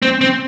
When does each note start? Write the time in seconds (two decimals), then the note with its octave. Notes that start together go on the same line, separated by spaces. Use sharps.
0.02 C4
0.21 C4